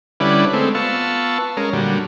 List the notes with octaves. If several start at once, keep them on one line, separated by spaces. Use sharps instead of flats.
D3 G3 C#4 E4 B4 D5
G#3 A3 C4
B3 F4 A5 C#6 E6
G#3 C#4 A#4
A#2 D3 F#3 G3